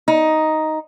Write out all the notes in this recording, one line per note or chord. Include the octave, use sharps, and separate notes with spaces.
D#4